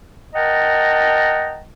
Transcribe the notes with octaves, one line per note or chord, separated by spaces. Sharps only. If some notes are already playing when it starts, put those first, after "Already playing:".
A#4 D#5 F#5 G5 A5 A#5